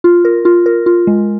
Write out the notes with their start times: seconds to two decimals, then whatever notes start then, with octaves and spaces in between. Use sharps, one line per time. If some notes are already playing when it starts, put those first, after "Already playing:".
0.04 F4
0.25 A#4
0.45 F4
0.66 A#4
0.86 F4
1.07 G#3